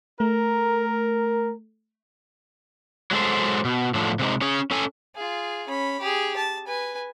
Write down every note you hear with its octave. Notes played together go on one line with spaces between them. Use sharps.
A3 A#4
F#3 G#3 A4 C5
B2
A2 D3 F3
C3 G#3 D#4
C#4 G#4 C#5
C#4 A4 G#5
F4 G#4
C#4 B5
G4 G#4
A5
B4 G#5